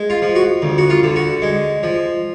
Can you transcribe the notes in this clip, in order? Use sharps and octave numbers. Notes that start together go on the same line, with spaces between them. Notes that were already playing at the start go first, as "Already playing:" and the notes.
Already playing: G#3
F4
F3
F#4
D2
F#4
F4
D3
F#4
G#3
F3